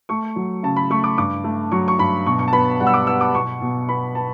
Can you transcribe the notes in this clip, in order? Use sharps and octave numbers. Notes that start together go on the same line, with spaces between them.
A3 C#6
F#3
C#3 A5
B5
A3 C#6
D6
G2 D6
A3
F#3 C#6
C#6
G2 B5
B2 C#6
C#6
A5
B3 B5
G3 F#5
E6
D6
B3 E6
D6
B2 C#6
B2
B3 B5
B3 A5